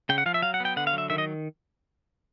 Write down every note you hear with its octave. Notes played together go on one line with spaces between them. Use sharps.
C#3 G5
F#5
F3 F5
E5
F#3 F5
F#5
B3 G5
D3 F#5
F5
F#3 E5
D#3 E5
D#5